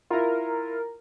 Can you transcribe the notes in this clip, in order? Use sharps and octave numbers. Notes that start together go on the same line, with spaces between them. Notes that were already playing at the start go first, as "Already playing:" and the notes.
E4 F4 A#4